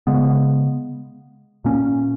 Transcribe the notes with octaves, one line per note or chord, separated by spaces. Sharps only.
C#3 G#3 B3
A#2 A#3 C#4